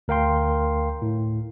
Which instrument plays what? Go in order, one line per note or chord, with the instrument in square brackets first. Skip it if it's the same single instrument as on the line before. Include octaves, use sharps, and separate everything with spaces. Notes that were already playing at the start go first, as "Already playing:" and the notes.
[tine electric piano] D2 A#4 F5 G5 C6
A2